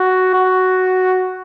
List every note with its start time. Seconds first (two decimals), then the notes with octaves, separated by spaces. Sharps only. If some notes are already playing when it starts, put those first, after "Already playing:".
Already playing: F#4
0.34 F#4